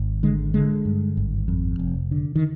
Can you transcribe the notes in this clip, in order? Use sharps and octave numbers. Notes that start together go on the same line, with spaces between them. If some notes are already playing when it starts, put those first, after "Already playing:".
Already playing: G#1
D3 G#3
D3 G#3
G2
G#1
F2
F1
D3
D#3